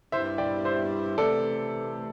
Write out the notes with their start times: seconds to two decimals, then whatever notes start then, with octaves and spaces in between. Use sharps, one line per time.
0.12 G2 G3 C4 E4 C5 E5
0.38 D5 G5
0.65 C5 E5
1.18 C3 E3 A3 A4 D5